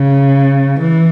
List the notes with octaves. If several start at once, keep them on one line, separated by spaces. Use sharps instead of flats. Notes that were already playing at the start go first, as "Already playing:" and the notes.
Already playing: C#3
E3